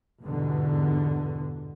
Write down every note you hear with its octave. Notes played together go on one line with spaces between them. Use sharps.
G1 E2 G#2 B2 D3